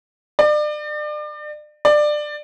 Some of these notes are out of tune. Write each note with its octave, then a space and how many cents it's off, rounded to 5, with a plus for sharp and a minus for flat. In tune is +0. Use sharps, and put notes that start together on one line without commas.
D5 +35
D5 +20